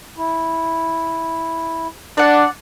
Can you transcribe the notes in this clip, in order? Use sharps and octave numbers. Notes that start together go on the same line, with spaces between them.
E4
D4 D5 F#5